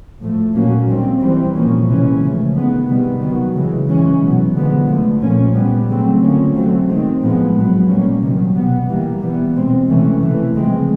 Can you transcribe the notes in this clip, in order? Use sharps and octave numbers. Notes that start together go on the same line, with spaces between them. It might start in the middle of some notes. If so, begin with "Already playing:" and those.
A2 F3 A3
A#2 F#3 A#3 C#4
D#3 G3 C4
E3 G3 C4
A#2 F3 A#3 C#4
C3 E3 G#3 C#4
C#3 F3 A3
D#3 G#3 B3
C3 D#3 G3 B3
D#3 F#3 B3
C#3 E3 G#3
E3 G#3 C#4
B2 F#3 B3
D3 F3 G#3 B3
D3 F3 A3
A#2 F3 A#3 C#4
A#2 G3 B3
C#3 F#3 A3 C4
D3 F3 A#3 C#4
D3 F#3 A3 C4
D#3 G#3 C4
A2 F3 G#3 B3
A2 F#3 B3
A#2 G3 A#3 C#4
C3 D#3 F#3
B2 G3 B3
E3 G3 A#3
E3 G3 B3
B2 G#3 C4
C3 E3 A3 C#4
C3 E3 A3
C#3 F3 G#3 C4